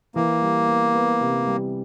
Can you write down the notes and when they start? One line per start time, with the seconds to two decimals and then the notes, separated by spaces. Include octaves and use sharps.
0.15 E3 A#3
0.42 G3
0.68 B3
0.94 B3
1.21 C3
1.47 G3